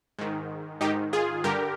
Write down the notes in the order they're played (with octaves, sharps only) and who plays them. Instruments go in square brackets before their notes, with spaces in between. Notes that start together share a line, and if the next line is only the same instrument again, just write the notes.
[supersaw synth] G#2 D#3
G#2 D#3 D#4 G4
F4 G#4
G2 D3 G4 A#4